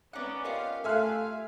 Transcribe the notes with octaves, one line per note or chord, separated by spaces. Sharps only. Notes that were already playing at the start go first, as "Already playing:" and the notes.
B3 C#4 D#4 D5 F#5
F4 G4 A#4 D#5 F5 F#5
A3 A4 E5 F5 G#5 C6 F6 F#6